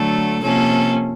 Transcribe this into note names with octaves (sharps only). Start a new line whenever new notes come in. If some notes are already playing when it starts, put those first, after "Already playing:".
Already playing: D3 F#3 A3 A4
C3 F3 A#3 C#4 A4